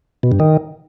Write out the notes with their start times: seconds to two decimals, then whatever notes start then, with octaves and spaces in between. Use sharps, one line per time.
0.23 B2
0.31 G2
0.40 D#3